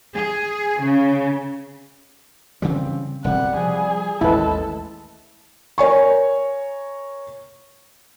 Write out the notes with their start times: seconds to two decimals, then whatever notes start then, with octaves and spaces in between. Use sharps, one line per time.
0.15 G#4
0.82 C#3
2.62 C#3 E3 G3 C4
3.24 E1 C3 G3 F#5
3.56 F3 G#4
4.21 A1 D#2 G#3 E4 A4 B4
5.78 A#4 C#5 G#5 C#6